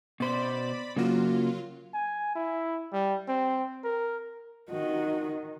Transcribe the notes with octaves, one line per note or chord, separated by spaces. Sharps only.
B2 C5 D5 B5
C#3 F#3 A#3 F4 F#4
G#5
E4
G3
C4
A#4
D#3 F#4 D#5